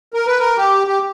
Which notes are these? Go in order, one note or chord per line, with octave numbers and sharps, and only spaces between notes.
A#4
B4
A#4
G4
G4